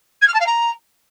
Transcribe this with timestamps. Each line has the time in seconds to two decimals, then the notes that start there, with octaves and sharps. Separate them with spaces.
0.21 G#6
0.27 F6
0.33 A5
0.40 F5
0.46 A#5